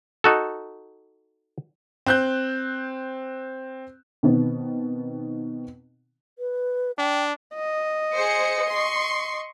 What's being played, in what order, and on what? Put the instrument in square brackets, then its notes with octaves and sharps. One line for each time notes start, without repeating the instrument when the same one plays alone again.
[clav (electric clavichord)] D#4 F#4 A4
[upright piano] C4 F#6 G6
[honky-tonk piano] B2 D#3 B3 C4
[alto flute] B4
[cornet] D4 [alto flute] G5
[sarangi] D#5
[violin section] G#4 C5 C#7
C6 C#6